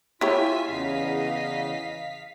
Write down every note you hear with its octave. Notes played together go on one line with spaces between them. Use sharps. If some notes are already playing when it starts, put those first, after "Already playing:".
E4 F4 G4 C#5 E5 G#5 B6
E2 C#3 D#5 F5 B6